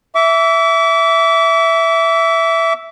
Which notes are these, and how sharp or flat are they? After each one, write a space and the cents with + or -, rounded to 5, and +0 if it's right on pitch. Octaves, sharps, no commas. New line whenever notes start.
E5 +0 D6 -40